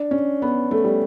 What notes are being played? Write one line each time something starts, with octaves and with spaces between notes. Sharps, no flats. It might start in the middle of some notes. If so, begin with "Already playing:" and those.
Already playing: D4
C#4
B3
A3
G3